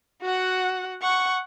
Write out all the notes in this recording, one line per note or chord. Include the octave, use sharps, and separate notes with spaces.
F#4 F#5
F#5 C#6